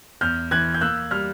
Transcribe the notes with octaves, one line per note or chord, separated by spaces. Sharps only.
E2 F6 G6
E3 F#6 G#6
G6
A#3 E6 F#6
G3 F6